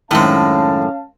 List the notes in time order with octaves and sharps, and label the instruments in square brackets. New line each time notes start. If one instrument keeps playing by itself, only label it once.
[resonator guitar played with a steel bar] F#2 A2 [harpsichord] D#3 G#3 C4 [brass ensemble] C#4 F5 A5